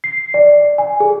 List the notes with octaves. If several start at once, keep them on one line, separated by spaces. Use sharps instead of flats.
C7
D5
G#5
G#4